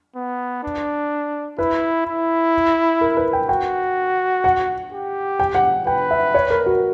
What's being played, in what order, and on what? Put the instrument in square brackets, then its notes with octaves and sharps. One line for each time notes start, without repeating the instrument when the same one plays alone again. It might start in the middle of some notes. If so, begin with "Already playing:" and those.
[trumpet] B3
D4
[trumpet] E4 [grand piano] B4
[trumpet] E4
[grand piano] A#4
B4
G5
[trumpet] F#4 [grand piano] G5
[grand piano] F#5
[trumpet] G4
[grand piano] G5
F#5
[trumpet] B4 [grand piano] G5
[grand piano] E5
C#5
A#4
F#4